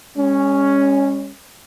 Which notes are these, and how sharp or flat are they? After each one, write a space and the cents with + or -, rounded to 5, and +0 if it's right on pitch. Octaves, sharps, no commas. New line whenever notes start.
G#3 -40 C#4 +0